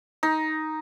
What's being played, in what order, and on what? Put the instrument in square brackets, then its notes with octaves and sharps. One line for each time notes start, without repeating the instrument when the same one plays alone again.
[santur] D#4